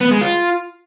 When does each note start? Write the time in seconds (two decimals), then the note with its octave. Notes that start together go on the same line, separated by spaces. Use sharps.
0.01 B3
0.11 G#3
0.21 F4